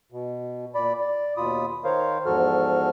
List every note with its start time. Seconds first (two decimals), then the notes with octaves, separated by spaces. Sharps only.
0.12 B2
0.75 A#2 D5 B5
1.01 D5
1.37 D#2 B2 F4 B5 D#6
1.84 D#3 A#4 C5 C#5 F5
2.26 E2 G#2 F3 F#4 A4 F6